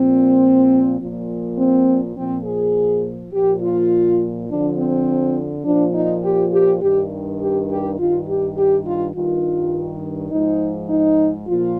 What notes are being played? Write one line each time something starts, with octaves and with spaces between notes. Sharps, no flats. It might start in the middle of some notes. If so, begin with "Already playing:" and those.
Already playing: A#2 F3 C4
A#2 F3
C4
A#2 F3 C4
G#4
A#2 F3 G4
F4
F2 D3 F3 D4
C4
A#2 F3 D4
D#4
G4
G4
G2 D#3 G4
G4
G4
G2 D#3 F4
G4
G4
F4
G2 D#3 F4
G#2 F3 D#4
D#4
A#2 F3 F4